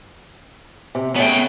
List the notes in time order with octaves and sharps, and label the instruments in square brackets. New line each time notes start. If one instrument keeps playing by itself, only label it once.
[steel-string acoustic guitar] C3
[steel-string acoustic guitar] C#3 A3 [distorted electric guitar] B3 G5